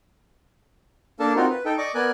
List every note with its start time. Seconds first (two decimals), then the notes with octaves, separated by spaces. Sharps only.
1.20 A#3 D4 A4 A#4 A5
1.36 C4 D#4 F4 F#4 A#4
1.50 B4
1.65 D#4 A4 G5
1.78 D5 D#5 C#6 D6
1.95 B3 A#4 D5 G#5 F#6